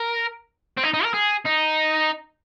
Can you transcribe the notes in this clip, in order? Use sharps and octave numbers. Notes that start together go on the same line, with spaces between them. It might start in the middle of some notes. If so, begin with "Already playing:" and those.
Already playing: A#4
C4
D#4
D#4
A#4
G#4
D#4